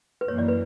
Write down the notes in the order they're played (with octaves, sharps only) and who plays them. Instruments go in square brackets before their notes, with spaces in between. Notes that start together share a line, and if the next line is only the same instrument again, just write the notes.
[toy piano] B4
[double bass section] F#2 E3 A#3 [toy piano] C#5
[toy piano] D5
B4